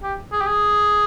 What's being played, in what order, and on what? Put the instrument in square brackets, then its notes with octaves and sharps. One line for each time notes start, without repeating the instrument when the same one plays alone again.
[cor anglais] G4
G#4
G4
G#4